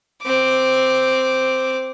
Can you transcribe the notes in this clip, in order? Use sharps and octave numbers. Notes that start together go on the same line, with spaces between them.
C4 D6